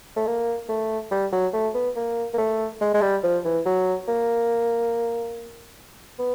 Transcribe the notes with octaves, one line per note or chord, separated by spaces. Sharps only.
A3
A#3
A3
G3
F#3
A3
B3
A#3
A#3
A3
G#3
G#3
G3
F3
E3
F#3
A#3
B3